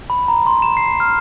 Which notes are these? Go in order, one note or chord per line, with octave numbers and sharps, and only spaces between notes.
B5
A#5
C6
E7
C7
F6